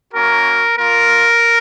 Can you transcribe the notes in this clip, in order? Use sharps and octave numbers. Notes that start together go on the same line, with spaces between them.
A#3 C#4 F#4 A#4
A#3 F4 A#4